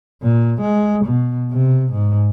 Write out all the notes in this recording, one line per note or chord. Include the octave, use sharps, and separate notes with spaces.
A#2
G#3
B2
C3
G#2